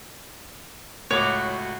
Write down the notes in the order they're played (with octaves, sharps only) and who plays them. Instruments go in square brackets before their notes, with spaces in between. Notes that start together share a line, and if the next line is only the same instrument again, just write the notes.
[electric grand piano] C#2 A2 C#6 [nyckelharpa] F#4 [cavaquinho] C#5 D6